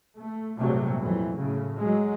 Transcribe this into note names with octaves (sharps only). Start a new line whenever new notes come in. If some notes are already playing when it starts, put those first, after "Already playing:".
A3
A#1 G#2 C3 F#3 G3 A3
F2 E3 F#3
A2 C#3
F#3 G#3